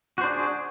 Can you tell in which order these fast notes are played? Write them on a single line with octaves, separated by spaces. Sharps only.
F#4 C5 D4 G#4